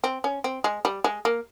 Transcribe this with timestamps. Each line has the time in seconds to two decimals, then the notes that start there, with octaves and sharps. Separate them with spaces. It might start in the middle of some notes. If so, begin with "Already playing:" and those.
0.04 C4
0.24 C#4
0.44 C4
0.64 G#3
0.85 G3
1.04 G#3
1.25 A#3